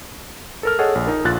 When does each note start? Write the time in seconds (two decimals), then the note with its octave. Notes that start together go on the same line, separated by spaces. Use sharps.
0.63 A4 A#4 F6
0.79 G#4 A4 C#5 D#5 F#5
0.95 A#1
1.07 D#4 A#4
1.25 A#1 F4 F#6 A6